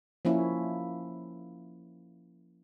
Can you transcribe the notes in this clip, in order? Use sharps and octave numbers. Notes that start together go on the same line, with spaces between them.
F3 A#3 C#4 E4